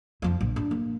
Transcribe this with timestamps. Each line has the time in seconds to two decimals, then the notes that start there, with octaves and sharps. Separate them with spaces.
0.22 F2 F3
0.41 A#1
0.56 D4
0.71 A#3